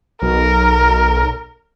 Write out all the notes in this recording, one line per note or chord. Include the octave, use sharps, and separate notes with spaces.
B1 A#4